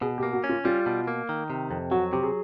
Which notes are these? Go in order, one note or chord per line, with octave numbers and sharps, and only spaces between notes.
B2 G#4
G4
A#3
F#4
C#4
F4
G3 F4
B2
A#3
D#3
C3
F2
F#3 F#4
C3 G4
G#4